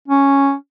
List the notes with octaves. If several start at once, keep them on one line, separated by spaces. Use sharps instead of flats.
C#4